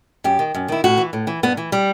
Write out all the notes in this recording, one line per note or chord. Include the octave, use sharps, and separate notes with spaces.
F#2 G4
D#3
F#2
D#3 E4
A2 F#4
E3
A2
E3
G2 B3
E3
G3